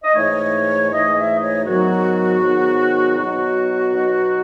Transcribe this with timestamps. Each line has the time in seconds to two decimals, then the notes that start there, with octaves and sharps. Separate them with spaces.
0.04 D#5
0.15 G#2 E3 A3 D#4 C#5
0.91 G#2 E3 A3 D#4 D#5
1.16 E5
1.35 D#5
1.41 C#5
1.66 G#2 D#3 F#3 B3 D#4 F#4
2.42 G#2 D#3 F#3 B3 D#4
3.18 B2 F#3 B3 D#4 F#4
3.93 B2 F#3 B3 D#4